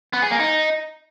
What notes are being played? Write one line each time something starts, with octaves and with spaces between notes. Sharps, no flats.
B3
G#4
A#3
D#4